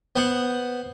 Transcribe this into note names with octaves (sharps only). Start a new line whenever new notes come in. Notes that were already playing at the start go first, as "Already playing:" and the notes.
B3 C5 F#5